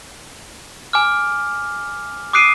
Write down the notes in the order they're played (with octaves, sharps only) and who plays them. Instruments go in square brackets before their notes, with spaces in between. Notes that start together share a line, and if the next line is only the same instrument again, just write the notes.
[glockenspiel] G#5 D6 F6
D6 D#6 F#6 C7 D7 D#7